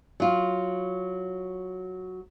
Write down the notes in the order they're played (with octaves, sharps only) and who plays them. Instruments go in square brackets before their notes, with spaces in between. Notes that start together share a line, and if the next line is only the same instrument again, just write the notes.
[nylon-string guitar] F#3 F4